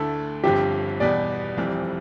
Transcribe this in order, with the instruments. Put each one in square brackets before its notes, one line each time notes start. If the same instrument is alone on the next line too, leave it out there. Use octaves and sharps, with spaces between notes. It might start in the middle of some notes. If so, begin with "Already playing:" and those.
Already playing: [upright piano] D2 D3 A3 E4 A4
[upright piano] G1 G2 D3 F3 C4 [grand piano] G4
[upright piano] E2 B2 G3 B3 [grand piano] D5
[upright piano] F1 F2 E3 G3 C4